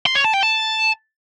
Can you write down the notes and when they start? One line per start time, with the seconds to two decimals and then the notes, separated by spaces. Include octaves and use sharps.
0.06 C6
0.15 C#5
0.25 A5
0.34 G5
0.43 A5